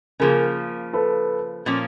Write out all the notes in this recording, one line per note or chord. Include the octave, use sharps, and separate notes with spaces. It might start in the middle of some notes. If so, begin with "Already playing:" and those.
C#3 F3 A#3 G#4 A#4
A4 B4
A#2 F3 A#3 C#4